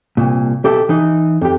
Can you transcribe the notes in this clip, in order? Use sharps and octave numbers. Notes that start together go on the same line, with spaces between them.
C2 A#2
B1 G4 A4 E5
E3 D#4
F2 G4